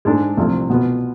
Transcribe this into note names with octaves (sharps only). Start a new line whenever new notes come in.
G#2 G#3 D4 A4
C2 C3 F3 A3
B2 B3 F4 B4